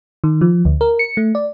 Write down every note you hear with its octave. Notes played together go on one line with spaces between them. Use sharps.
D#3
F3
D2
A#4
C#7
A3
D5